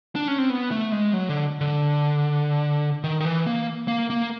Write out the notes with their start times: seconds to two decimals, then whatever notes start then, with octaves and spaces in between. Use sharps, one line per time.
0.15 D4
0.28 C#4
0.38 C4
0.50 B3
0.71 A3
0.92 G#3
1.13 F#3
1.29 D3
1.61 D3
3.04 D#3
3.20 D#3
3.25 E3
3.46 A#3
3.88 A#3
4.10 A#3